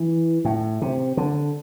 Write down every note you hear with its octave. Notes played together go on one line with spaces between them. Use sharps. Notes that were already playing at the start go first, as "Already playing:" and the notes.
Already playing: E3
A2
C3
D3